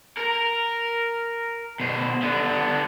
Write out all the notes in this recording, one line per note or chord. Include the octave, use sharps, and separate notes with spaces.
A#4
B2 C5
D3 B3